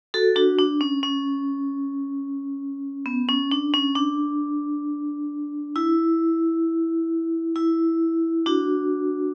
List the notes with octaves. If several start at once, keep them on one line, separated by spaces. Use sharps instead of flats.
F#4 A4
D4 F#4
D4
C#4
C#4
B3
C#4
D4
C#4
D4
E4
E4
D4 F#4